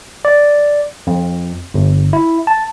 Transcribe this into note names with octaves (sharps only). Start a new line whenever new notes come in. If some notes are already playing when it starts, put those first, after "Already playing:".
D5
F2
G1
E4
A5